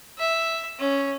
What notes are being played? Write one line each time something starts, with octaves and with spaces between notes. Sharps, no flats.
E5
C#4